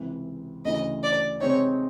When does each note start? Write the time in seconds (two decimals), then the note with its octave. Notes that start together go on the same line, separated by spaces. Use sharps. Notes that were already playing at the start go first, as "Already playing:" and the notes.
Already playing: C#2 C3 E3
0.65 D2 C#3 E3 D#5
1.03 D5
1.41 C3 D#3 G#3 C4 D#4 C#5